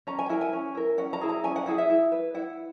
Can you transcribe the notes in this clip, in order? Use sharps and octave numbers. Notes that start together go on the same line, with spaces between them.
C#4 A#5
G#5
E4 A#4 F#5
G#5
C#4
E4 A#4
C#4 F#5
A#5
E4 G#4
A#5
C#4 G#5
F#5
E4 G#4 F#5
E5
E4
B4
E4 F#5